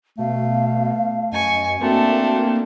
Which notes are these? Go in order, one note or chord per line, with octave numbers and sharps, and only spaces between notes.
B2 A3 F5
F#2 D#5 G#5 C#6
A3 A#3 C4 D4 F#4